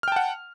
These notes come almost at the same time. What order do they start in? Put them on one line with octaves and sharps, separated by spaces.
F6 G5 A5 F#5